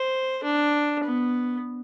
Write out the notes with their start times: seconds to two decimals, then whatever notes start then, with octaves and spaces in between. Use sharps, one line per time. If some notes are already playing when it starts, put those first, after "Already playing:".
Already playing: C5
0.44 D4
1.04 B3